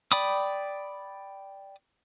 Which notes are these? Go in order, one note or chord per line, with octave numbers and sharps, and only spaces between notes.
D5 G5 B5 D6 D#6